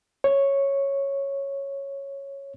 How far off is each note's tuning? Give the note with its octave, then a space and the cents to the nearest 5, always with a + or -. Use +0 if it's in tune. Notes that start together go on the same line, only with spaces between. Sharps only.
C#5 -5